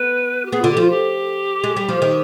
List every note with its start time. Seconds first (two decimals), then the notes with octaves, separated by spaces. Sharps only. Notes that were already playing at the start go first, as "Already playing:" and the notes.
Already playing: B3 B4
0.45 G4
0.51 B3 G#4
0.61 D3 F4
0.71 G4
0.77 F3 F4
0.90 G4
1.64 G#3
1.76 G3
1.89 F3
2.02 D#3